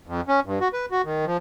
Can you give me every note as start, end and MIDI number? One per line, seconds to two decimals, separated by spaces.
0.07 0.21 41
0.28 0.40 61
0.46 0.59 43
0.61 0.68 66
0.73 0.86 71
0.92 1.02 66
1.05 1.25 51
1.26 1.37 53